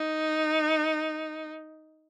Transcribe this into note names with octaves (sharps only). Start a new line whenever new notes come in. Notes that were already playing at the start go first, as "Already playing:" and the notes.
Already playing: D#4